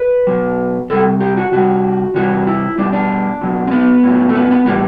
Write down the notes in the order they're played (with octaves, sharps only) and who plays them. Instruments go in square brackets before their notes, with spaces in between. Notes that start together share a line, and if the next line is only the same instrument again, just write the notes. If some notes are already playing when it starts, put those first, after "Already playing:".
Already playing: [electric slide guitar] B4
B2 F#3
C3 G3 A4
G4
F#4
C3 G3 F#4
C3 E3 G3 F#4
E4
B2 G3 D4
D4
B2 F#3
C4
B3
A2 F#3
A3
B3
B3
A2 E3 G3 B3